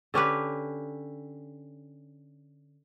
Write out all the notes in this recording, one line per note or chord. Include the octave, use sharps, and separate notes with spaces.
D3 C#4 G4 B4